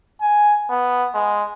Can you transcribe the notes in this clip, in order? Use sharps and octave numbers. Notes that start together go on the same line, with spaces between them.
G#5
B3
G#3